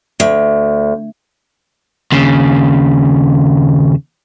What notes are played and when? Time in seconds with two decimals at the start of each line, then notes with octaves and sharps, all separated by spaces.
0.20 D2
2.12 D#2 C#3